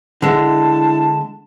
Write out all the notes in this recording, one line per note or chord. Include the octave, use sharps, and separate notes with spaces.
D3 G#3 D4 E4 A5